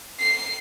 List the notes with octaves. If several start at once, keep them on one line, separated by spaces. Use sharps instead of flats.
C7